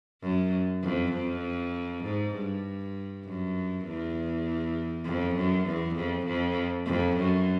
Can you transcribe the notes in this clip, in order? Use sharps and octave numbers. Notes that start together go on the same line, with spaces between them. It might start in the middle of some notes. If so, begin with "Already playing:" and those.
F#2
F2
F2
G#2
G2
F#2
E2
F2
F#2
E2
F2
F2
F2
F#2